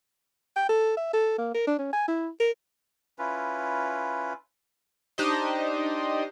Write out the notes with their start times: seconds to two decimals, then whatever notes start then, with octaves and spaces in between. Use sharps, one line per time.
0.56 G5
0.69 A4
0.97 E5
1.13 A4
1.38 A#3
1.54 A#4
1.67 D4
1.79 C#4
1.93 G#5
2.08 E4
2.40 A#4
3.19 C#4 E4 F4 B4
5.18 D4 D#4 G4 C5 D#5